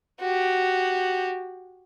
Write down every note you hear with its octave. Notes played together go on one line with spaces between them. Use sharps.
F#4 G4